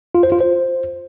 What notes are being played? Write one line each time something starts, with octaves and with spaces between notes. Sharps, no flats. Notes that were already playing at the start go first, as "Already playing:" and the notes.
F4
C5
F4
C5